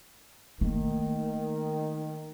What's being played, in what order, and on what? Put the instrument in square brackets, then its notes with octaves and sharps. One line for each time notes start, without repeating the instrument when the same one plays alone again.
[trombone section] D#3 [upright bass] A3 A#3